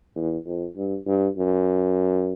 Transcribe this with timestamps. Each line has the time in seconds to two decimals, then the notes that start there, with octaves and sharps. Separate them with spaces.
0.15 E2
0.45 F2
0.76 G2
1.07 G2
1.37 F#2